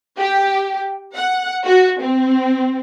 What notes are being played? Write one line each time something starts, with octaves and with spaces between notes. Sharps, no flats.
G4
F#5
F#4
C4